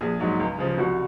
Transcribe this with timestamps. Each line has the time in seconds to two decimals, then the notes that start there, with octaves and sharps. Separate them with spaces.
0.01 A#1 G#4
0.20 G#2 F#3
0.39 C#2
0.58 C#3 F3
0.78 C2 F#4